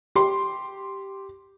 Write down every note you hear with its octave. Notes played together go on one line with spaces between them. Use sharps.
G4 C6